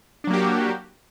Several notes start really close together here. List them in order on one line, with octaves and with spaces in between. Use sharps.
D4 F#3 A#3 G4 F#4